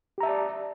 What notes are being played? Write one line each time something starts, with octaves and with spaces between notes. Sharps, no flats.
G4 D5 E5 A5 A#5